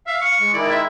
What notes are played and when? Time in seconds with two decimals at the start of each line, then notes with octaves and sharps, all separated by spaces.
0.07 E5 F5
0.21 C#6
0.40 G#3
0.54 D#3 G#3 E4 D5
0.71 E5